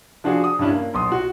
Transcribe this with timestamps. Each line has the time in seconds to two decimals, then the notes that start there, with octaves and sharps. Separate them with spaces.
0.24 F3 D4 F4 F#4 G#4
0.44 D#6
0.59 G2 G3 C#4 D4 E4
0.71 A#3
0.94 B1 C6 D#6
1.12 F#4